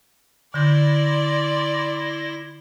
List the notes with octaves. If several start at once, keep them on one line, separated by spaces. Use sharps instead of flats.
D3 E4 D5 C6 G6 A#6